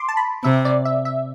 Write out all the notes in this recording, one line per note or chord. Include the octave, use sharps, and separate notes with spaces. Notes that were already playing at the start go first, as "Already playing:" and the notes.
Already playing: C6 D6
A5
B5
C3 E5
D5
E5
E5